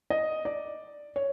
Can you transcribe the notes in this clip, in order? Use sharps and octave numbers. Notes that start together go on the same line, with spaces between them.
D#5
D5
C#5